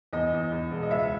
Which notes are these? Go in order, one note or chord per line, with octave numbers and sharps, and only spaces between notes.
E2 D#5
E2
E2
E1
D#5
C#2 E5